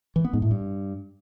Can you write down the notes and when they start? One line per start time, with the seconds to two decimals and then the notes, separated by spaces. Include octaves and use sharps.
0.16 E3
0.25 B3
0.33 G#2
0.42 A2
0.51 G2